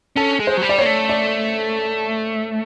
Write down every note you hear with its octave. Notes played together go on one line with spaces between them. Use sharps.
C#4 A4
G#3
C5
F#3
G3
D5
A#3 C#5
A3
D5